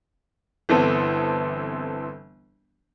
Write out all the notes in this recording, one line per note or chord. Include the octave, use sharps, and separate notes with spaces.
G1 E3 B3 C4 A4